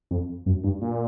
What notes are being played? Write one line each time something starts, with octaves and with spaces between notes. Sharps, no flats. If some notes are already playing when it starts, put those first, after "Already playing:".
F2
F#2
G2
A#2